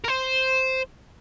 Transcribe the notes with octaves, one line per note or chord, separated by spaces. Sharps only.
A#4
C5